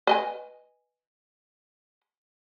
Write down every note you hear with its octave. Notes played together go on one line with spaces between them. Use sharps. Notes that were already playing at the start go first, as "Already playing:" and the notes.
B4 D#5 G#5